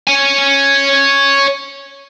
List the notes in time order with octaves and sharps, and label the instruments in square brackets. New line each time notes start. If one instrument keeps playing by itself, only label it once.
[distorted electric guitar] C#5 G#5